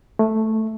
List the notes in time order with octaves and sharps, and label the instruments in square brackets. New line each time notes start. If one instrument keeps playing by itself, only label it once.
[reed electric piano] A3